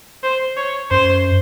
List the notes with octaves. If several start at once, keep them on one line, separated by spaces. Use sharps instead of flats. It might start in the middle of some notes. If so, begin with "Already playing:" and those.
C5
C#5
F#2 C5